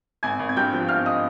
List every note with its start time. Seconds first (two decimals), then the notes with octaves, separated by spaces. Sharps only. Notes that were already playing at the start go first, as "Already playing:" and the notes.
0.23 G#1 G#5 G#6
0.39 G#1
0.49 G#6
0.56 G2 G5 G6
0.73 F3
0.88 G#1 F5 F6
1.06 D#5 D#6